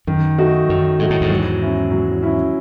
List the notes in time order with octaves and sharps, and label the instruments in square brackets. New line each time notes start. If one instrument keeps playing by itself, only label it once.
[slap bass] F#2 [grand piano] D#3
[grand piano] A3 D#4 F#4
[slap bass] F#2 [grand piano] D#3
[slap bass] G#2 [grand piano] A3 D#4 F#4
[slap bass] A2
E2 G#2
[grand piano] F#3
C#4 E4
F#3
C#4 E4